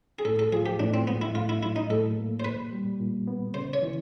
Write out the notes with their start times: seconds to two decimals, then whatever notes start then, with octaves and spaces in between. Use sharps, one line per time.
0.19 G#4
0.25 A2 A4
0.39 A4
0.52 F3 G#4
0.66 G4
0.79 A2 D4
0.94 C4
1.07 G#3 B3
1.21 E4
1.35 A2 F4
1.49 E4
1.62 F#3 E4
1.76 D#4
1.90 A2 A4
2.17 A#3
2.40 C5
2.45 A#2 B4
2.72 G3
3.00 A#2
3.27 B3
3.54 C#3 C5
3.73 C#5
3.82 E3